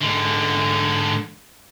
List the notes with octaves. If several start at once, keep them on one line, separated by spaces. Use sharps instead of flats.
G#2 D3